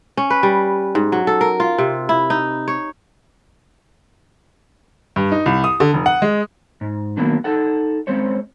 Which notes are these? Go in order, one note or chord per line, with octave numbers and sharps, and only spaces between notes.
C#4
B4
G3
G#2
F#3
A4
A#4
F4
C3
E4
D#4
C#5
G2
D#4
C2
D#6
D3
F1
F#5
G#3
G#2
D#3 F#3 A#3 B3 D4
D#4 A4 F#5
G#3 C4 C#4 C5 C#5